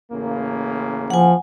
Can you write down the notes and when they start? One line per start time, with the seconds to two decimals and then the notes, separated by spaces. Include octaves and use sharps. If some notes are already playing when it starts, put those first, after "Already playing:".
0.12 A1 C#3 A#3
1.10 F3 F#5 G#5